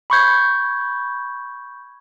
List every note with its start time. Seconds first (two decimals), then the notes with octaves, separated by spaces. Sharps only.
0.10 B5 C#6 G6 G#6